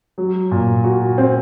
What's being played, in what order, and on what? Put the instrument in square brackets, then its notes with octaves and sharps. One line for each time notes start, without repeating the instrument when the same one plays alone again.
[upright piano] F#3
A#2
F#4
C4